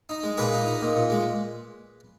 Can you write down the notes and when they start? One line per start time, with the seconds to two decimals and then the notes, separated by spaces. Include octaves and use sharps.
0.09 D#4
0.23 G#3
0.37 A#2 G#4 B4
0.52 D#4
0.66 D#4
0.81 A#2
0.95 A#2
1.10 G#3